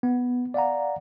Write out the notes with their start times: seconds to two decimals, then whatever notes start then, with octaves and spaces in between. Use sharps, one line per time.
0.03 B3
0.54 D5 F5 F#5 A#5